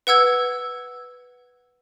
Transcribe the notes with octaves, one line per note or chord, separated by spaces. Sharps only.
B4 F#5 E6 G#6